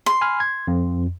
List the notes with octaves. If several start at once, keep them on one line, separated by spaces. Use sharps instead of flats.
C6
G#5 B5 F6
G#6
F2